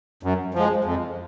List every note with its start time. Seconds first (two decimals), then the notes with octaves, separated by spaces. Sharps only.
0.23 F#2
0.54 F3 G#3
0.85 F2